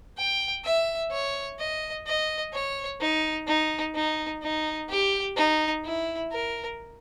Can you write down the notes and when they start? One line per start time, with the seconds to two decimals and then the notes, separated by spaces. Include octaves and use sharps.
0.17 G5
0.65 E5
1.11 C#5
1.59 D#5
2.07 D#5
2.53 C#5
3.00 D#4
3.48 D#4
3.95 D#4
4.42 D#4
4.89 G4
5.36 D#4
5.84 E4
6.32 A#4